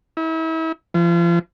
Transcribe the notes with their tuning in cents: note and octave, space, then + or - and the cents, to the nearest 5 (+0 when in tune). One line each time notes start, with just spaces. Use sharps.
E4 -35
F3 -35